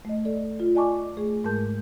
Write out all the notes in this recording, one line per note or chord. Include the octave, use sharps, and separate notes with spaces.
A3 D#5
A4 D5
F4
D5 D#5 G#5 A5 C#6 D6
A3 G#4
G#2 G#3 A#4 A5 G6